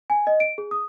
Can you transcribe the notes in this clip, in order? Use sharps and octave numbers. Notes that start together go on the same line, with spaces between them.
G#5
D#5
D7
G#4
D#6